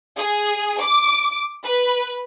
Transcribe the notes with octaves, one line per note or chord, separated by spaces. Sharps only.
G#4
D6
B4